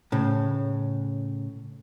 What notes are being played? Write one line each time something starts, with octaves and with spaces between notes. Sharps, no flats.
A2 C#3